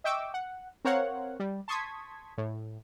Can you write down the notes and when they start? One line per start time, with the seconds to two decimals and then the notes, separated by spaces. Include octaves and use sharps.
0.04 D#5 E5 G5 C#6 D6 E6
0.34 F#5
0.85 C4 A#4 C5 C#5 F5 F#5
1.40 G3
1.68 A5 C6 C#6 D#6 G#6 B6
2.38 A2